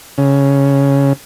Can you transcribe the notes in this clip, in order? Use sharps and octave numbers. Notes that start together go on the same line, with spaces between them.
C#3